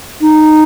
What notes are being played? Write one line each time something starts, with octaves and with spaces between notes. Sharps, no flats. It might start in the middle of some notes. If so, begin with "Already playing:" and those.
D#4